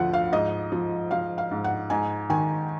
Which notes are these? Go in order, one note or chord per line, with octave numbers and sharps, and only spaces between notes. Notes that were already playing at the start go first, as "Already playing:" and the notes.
Already playing: D2 D3 F3 F#5
F5
G#2 D#5
F3
F3 F5
F5
G#2
F#5
G#2 G#5
D#3 G#5